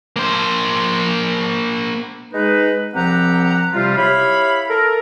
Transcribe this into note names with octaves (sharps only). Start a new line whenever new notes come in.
A#3 C5
G#3 D#4 B4
C2 F3 C4 G4 F#5 A#5
C3 G3 F4
E4 G4 C#5 F5 B5
A4 A#4